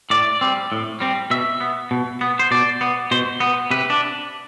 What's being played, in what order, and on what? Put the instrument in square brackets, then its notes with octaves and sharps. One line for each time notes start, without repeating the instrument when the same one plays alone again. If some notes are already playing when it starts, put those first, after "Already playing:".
[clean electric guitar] A2 D5
G3 C4
A2
G3 C4
B2 E5
B3
B2
B3
C5
B2 D5
B3
B2 C5
B3
C3 B4
D4